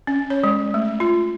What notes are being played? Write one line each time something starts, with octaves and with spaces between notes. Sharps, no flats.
C#4
C#5
G#3
A3
F4